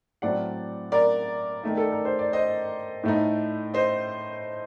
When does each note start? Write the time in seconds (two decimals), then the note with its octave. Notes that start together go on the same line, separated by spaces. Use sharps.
0.22 A2 F#3 A3 C4 D5 F#5
0.92 A#4 D5
1.63 D#3 A3 D#4
1.77 A4
1.92 A#4
2.05 C5
2.19 D5
2.33 C5 D#5
3.03 A2 A3 D#4
3.74 C5 D#5